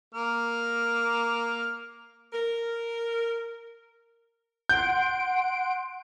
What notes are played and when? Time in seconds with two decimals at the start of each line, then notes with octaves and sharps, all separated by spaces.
0.15 A#3 A#4 F6
2.33 A#4
4.69 F#5 C6 G6 D7